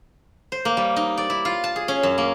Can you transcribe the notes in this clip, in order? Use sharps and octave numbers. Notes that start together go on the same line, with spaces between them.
C5
A#3
G3
D#4
D5
E4
F4
A5
G#4
C#4
F#2
A#3